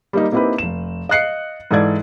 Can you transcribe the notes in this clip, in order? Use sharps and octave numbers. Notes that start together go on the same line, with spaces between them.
G3 A#3 D#4
A#3 C4 D#4 E4 G4 B4
F1 E7
D#5 F5 F#6 C7 C#7
G#2 E3 A4 D5 G#6